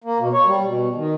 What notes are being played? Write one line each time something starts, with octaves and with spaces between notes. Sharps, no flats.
A#3
B2
C#5
G3
B2
D#3